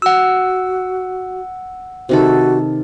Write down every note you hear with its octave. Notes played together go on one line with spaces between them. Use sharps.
F#4 F#5 E6
C3 D#3 F#4 A4